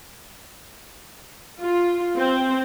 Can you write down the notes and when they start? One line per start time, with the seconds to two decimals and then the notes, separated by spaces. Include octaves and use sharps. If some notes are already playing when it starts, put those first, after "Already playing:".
1.60 F4
2.17 C4